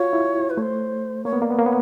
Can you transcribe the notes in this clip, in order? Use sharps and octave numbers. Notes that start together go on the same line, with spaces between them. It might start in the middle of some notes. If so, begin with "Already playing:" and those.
Already playing: F4 F#4 C#5
E4
B4
A3 C5 C#5
A#3 C#5
B3
A#3 D5
B3
A#3 C#5
B3